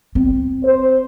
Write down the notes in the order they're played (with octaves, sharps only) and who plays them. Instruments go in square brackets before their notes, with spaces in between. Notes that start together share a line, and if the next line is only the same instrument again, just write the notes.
[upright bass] C4
[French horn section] C5